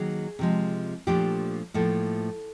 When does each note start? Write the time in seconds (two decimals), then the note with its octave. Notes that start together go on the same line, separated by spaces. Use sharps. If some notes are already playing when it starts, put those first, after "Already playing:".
Already playing: D#3 F#3 A#3 G#4
0.39 C3 F3 G#3
1.07 A#2 F3 A3 D4 G4
1.74 A2 F3 A#3 A4